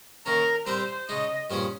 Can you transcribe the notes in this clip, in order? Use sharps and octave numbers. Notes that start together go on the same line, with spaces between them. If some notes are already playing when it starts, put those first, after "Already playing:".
D#3 A#3 C#4 A#4
G3 C4 G4 A#4 C5
C#3 G#3 D#4 D#5
G2 F3 A#3 C#4 G#4